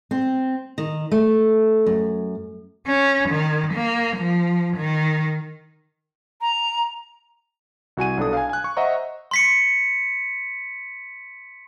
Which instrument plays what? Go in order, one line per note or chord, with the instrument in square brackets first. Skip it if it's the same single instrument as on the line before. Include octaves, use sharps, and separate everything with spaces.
[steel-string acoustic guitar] C4
D#3
A3
F#2
[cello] C#4
D#3
A#3
F3
D#3
[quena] A#5
[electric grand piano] C2 F#4 G#5 D#7
B1 D4 A4 D#6
F5 G#5
G#5 F#6
C#6
C5 D#5 E5 F#5 A#5 C#6
[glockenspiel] C6 B6 C#7